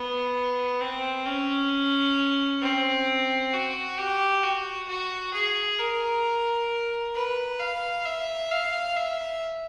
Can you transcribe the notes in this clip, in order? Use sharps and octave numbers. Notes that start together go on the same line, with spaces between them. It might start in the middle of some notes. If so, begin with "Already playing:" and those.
Already playing: B3
C4
C#4
C4
F#4
G4
F#4
F#4
G#4
A#4
B4
F5
E5
F5
E5